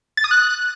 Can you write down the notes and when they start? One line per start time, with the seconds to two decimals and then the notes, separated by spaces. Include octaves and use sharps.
0.17 A6
0.24 D#6
0.31 F#6